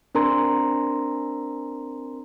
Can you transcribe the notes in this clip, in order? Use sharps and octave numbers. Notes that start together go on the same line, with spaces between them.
C4 D4 A#4 A#5 C6